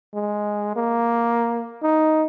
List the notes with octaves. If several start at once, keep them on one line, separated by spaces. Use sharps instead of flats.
G#3
A#3
D#4